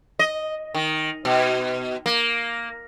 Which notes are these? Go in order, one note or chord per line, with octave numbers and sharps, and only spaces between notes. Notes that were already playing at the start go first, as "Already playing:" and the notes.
D#5
D#3
B2
A#3